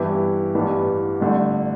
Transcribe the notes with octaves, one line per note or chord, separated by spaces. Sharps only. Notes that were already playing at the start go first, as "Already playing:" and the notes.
Already playing: G2 E3 B3 E4 G4
A1 G2 E3 G3 B3
G1 G2 D3 A3